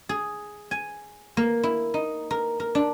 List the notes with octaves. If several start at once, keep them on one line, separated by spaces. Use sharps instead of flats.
G#4
G#5
A#3
E4
D#4
A#4
A#4
D4